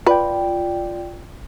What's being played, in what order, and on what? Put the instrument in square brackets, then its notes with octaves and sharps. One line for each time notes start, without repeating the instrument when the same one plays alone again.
[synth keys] F4 D5 G5 [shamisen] B4